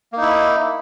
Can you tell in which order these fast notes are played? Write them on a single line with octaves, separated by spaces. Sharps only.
A#3 D#4 E4